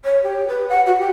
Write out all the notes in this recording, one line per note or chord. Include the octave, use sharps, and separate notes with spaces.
C#5
G4
B4
F#5
F#4
G4